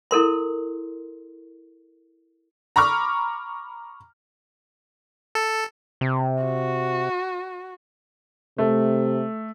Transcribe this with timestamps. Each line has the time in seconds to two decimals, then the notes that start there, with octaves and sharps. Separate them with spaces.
0.11 E4 A4 A#4 C6
2.76 A#5 B5 C#6 D6 F6
5.35 A4
6.01 C3
6.44 F#4
8.58 C3 A3